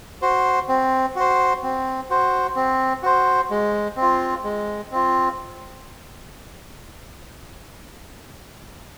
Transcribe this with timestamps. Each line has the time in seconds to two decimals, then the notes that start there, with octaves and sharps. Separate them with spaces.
0.22 F#4 C5
0.68 C4
1.16 F#4 C5
1.63 C4
2.10 F#4 C5
2.56 C4
3.03 F#4 C5
3.50 G#3
3.96 C4
4.02 F4
4.44 G#3
4.91 C4 F4